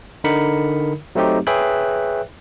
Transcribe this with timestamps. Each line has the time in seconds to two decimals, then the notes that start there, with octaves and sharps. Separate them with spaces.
0.24 D3 D#4 A#4 B5 C#7
1.15 F#3 A3 C4 D#4 G4
1.47 G#4 B4 C#5 E5 G5 F#6